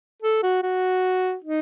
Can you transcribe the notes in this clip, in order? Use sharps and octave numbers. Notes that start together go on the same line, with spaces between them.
A4
F#4
F#4
D#4